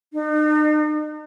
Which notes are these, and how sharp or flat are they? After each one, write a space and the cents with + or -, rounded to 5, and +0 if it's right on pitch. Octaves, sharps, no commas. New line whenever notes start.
D#4 -45